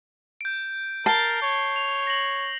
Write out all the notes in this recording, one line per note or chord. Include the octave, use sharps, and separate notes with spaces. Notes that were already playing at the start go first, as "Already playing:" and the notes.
G6 D7
A#4 A5 C7 G7
C#5
F7
A#6 F#7